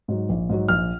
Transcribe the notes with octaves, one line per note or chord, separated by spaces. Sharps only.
G#2 F#3
A#1
G#2 F#3
A#1 F6